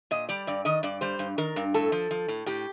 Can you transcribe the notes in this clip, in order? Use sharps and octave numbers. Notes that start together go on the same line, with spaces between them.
A#2 D#5
G3 D5
G2 D5
D#3 D#5
G2 D5
G3 C5
G2
D#3 A#4
G2
A2 A4
F3
F3
A2
A2 G4